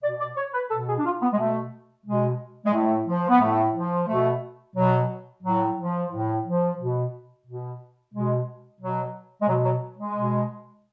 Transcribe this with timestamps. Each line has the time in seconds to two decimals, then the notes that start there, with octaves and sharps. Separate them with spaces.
0.03 B2 D5
0.20 D5
0.37 C#5
0.53 B4
0.70 B2 A4
0.88 G#4
0.99 D4
1.05 F4
1.21 B3
1.33 G#3
1.38 B2 A3
2.06 B2 G#3
2.66 G#3
2.73 A2 A3
3.06 F3
3.29 B3
3.41 A2 A3
3.75 F3
4.08 B2 A3
4.76 B2 F#3
5.43 A2 F#3
5.77 F3
6.10 A2
6.45 F3
6.78 B2
7.47 B2
8.14 B2 G#3
8.81 B2 F#3
9.41 G#3
9.48 B2 F#3
9.65 F#3
9.98 G#3
10.16 B2